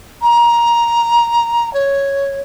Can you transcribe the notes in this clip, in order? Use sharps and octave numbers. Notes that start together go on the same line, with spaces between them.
A#5
C#5